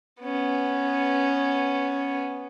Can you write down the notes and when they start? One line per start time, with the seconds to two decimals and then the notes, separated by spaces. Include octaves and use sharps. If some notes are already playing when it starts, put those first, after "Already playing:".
0.21 B3 C#4